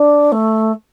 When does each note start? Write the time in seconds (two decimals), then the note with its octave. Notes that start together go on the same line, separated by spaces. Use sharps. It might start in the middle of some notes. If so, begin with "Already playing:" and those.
Already playing: D4
0.32 A3